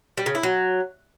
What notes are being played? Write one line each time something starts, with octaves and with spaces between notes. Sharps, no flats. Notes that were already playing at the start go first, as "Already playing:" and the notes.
G3
C#3
E4
F#3